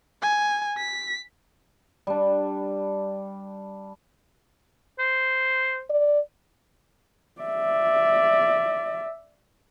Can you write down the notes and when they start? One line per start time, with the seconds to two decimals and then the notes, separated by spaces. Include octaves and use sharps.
0.22 G#5
0.78 B6
2.07 G3 D4
4.99 C5
5.90 D5
7.42 D5 E5